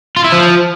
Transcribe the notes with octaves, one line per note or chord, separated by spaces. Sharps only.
F4
E4
F3